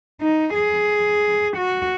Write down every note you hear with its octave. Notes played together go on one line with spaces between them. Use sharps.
D#4
G#4
F#4